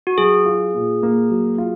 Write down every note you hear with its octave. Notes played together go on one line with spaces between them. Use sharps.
F#4
F#3 G#4
F4
A#2
A#3
F#3
F4